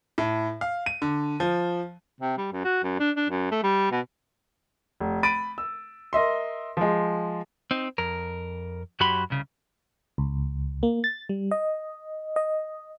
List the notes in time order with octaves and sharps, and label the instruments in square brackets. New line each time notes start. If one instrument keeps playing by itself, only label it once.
[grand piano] A2
F5
D#7
D3
F3
[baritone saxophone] C3
G3
F#2
F#4
F#2
D4
D4
F#2
A3
G3
B2
[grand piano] F1
B5 A6 D7 D#7
E6
A#4 D#5 E5 C6
F3 G#3
[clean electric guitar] C4 D#4
F2 A#4
F#2 F#3 F#4 G4 B5 C6
C2 C#3
[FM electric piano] C#2
A#3
A6
G3
D#5
D#5